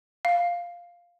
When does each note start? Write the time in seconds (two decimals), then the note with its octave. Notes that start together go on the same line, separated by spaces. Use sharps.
0.25 F5